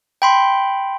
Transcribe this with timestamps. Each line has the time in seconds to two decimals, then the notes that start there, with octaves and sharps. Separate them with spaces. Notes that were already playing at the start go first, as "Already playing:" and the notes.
0.22 G5 B5 C6